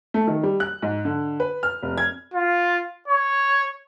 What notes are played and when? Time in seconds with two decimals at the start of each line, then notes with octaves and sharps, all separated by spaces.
0.14 A3
0.27 D#3
0.43 G3
0.60 F#6
0.82 G#2
1.05 D3
1.40 B4
1.63 F6
1.83 F1
1.98 G#6
2.34 F4
3.08 C#5